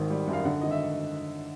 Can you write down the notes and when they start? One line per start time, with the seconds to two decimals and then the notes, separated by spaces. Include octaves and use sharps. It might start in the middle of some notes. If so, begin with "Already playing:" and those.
Already playing: G#1 G#2 D#3
0.10 G3
0.28 F#2
0.33 F5
0.45 D3 F#5
0.61 G#1 D#5
0.71 E5